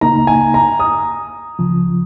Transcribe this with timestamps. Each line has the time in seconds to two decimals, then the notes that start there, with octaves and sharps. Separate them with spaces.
0.01 C#2 C#3 A#3 D#4 A#5
0.27 G#5
0.54 A#5
0.79 D#6
1.59 C#2 C#3 F3